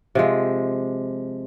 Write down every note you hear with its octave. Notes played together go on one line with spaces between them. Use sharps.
C3 F3 G#3